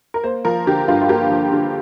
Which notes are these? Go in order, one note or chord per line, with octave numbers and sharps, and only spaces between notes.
A#4
A#3 C5
F3 A#4
D3 G4
G2 F4
F4
A#3 G4
F3
D3